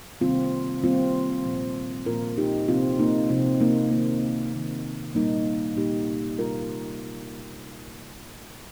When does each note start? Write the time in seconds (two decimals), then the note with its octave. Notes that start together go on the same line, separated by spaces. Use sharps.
0.21 C3 D#3 G3 A#3 C4 F4
0.83 C3 D#3 G3 A#3 C4 F4
1.45 A#2 F3 A#3
2.06 A#2 F3 A#3 F4 A#4
2.38 D#4 G4
2.68 C3 F3 A#3 C4 F4
2.99 A#3 D#4
3.30 C3 F3 A#3 C4 F4
3.61 A#3 D#4
3.91 D#3 A#3
4.53 D#3 A#3
5.15 A#2 G3 A#3 D#4
5.77 A#2 G3 A#3 D#4 G4
6.39 C3 G3 A#3 F4 A#4